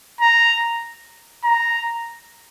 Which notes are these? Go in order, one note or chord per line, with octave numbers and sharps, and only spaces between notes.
A#5
A#5